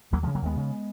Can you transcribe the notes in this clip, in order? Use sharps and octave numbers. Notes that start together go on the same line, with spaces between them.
D#2 F#3 A#3
C#3 F3 G#3
F#3 A#3
D#2 G#3 B3
C#3